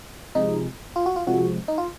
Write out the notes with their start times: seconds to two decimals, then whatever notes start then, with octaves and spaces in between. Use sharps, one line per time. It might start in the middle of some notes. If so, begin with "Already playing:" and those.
0.35 C3 F3 G#3 D#4
0.96 F4
1.06 F#4
1.16 F4
1.27 C3 F3 G#3 F#4
1.68 D#4
1.78 F4